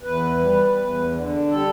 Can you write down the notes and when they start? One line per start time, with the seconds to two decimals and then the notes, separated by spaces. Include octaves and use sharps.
0.02 E2 B4
0.39 G3
0.76 E2
1.13 D3
1.49 G3 A4